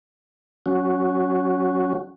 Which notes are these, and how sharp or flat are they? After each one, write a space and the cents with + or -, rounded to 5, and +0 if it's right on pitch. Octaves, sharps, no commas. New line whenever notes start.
F#3 +0 C#4 +0 F#4 +0